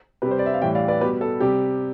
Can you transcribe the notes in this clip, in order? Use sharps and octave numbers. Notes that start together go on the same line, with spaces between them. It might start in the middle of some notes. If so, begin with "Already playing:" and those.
C3 G3 G4 B4
C5
D5
E5
F5
A2 E3 G3 E5 G5
D5 F5
B4 D5
B2 G3 G4 B4
A4
C3 G3 G4